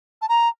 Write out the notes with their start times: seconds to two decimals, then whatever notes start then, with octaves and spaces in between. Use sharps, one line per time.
0.22 A5
0.29 A#5